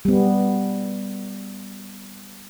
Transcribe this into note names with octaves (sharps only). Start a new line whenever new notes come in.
G3 B3